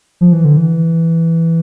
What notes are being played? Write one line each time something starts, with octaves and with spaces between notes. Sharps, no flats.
F3
E3
D3
E3